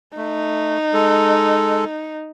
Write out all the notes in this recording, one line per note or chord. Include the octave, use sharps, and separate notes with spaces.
A3 D#4
G#3 A4